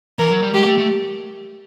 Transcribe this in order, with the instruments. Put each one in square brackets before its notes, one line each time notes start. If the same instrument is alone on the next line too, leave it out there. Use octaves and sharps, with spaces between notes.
[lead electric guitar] E3 [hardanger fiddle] A#4
[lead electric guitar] F#3
G3
[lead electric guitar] G#3 [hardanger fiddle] G4
[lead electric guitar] A3
A3